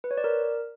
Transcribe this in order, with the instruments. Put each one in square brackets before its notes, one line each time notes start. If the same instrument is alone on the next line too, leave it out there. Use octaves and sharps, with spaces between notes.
[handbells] B4
C#5
D5
A#4